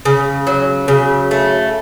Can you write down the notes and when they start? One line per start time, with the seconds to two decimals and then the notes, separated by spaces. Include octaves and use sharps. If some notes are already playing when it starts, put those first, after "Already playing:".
0.05 C#3
0.47 F#3
0.88 C#3
1.31 A3